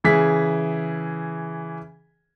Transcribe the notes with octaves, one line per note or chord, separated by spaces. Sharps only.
C#3 E3 G#4 B6